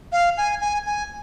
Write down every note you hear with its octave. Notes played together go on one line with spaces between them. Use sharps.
F5
G#5
G#5
G#5